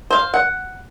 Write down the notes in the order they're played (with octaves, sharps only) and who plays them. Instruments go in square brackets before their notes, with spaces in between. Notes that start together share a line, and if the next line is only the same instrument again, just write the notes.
[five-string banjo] C5 F5
F#5